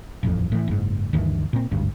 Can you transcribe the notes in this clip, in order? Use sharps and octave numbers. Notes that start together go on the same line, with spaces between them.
D#1 A1 F2
A2 E3
F#1 G#2
D2 G2 D#3 E3
A#2 C4
G#1 D2 G2